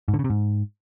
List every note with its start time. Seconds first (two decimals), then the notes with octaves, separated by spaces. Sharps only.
0.08 G#2
0.14 D3
0.19 C#3
0.24 C3
0.30 G#2